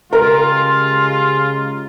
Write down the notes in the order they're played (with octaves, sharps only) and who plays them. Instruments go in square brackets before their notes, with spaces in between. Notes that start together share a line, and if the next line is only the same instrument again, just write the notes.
[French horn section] C#3 G#3 G4 [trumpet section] F4 [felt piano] A#4